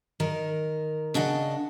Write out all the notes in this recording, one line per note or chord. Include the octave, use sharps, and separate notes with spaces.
D#3 A#4
C#3 D4 D#5 F#5